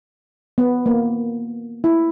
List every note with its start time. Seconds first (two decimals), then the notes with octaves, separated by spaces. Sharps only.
0.58 B3
0.86 A#3
1.84 E4